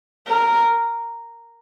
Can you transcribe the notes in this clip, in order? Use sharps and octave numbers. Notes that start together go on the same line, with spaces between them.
A#4